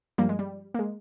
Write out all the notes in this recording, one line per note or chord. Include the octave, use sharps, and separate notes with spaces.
G2 F3 G3 A#3
G#3
G3
A#3
G#3